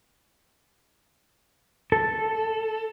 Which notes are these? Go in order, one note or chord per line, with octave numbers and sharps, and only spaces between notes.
A4